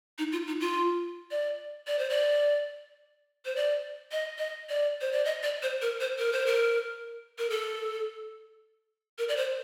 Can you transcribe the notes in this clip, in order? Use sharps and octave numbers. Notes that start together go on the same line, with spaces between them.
D#4
F4
D#4
F4
D5
D5
C5
D5
C5
D5
D#5
D#5
D5
C5
D5
D#5
D5
C5
A#4
C5
A#4
C5
A#4
A#4
A4
A#4
D5
C5